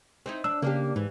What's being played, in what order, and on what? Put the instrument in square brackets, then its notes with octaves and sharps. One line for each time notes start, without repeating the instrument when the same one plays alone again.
[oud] C4 D#4 E4
[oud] D4 [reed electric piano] E6
[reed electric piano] C#3 [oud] A#3 D4 G4
[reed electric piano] G#2 [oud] E3